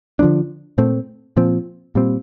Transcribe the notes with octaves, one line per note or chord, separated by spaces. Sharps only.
D3 F3 A#3 D4
A#2 A3 C4
A#2 F3 C4
A#2 G3 C4